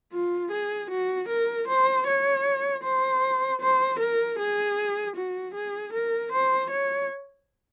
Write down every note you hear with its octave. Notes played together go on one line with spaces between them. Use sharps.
F4
G#4
F#4
A#4
C5
C#5
C5
C5
A#4
G#4
F#4
G#4
A#4
C5
C#5